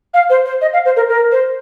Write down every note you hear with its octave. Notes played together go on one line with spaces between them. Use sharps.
F5
C5
C5
D#5
F5
C5
A#4
A#4
C5